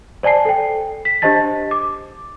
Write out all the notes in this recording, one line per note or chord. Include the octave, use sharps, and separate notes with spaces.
C5 D5 G#5 A5 C7
A4 G5
B6
D4 G4 C5 D#5 A5 A6
D6